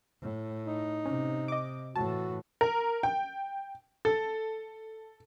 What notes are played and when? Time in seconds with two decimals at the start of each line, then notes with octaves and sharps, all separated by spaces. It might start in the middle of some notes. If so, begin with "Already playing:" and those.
0.21 A2
0.67 D#4
1.05 C3 C#4
1.48 D#5 D6
1.96 A2 E3 F#4 A5
2.61 A#4
3.03 G5
4.05 A4